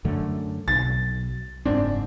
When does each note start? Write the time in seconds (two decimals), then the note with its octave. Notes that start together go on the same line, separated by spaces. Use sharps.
0.05 F#2 D3 A3
0.68 B1 A6
1.65 F#1 G#2 C4 D4